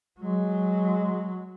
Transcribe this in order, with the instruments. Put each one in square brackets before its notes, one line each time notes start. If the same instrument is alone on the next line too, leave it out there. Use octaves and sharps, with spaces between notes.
[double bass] F#3 [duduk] G#3